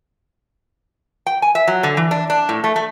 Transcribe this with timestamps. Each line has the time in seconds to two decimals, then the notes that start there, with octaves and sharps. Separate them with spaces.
1.26 G5
1.42 G#5
1.55 E5
1.67 F#3
1.83 D3
1.97 E3
2.11 D4
2.30 D4
2.49 A2
2.64 A3
2.76 A3